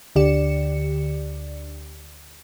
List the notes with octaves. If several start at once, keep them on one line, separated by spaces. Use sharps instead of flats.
D2 D3 G4 D5 C#7 E7